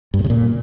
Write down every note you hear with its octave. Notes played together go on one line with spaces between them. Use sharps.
G2
A#2
C#3
A#2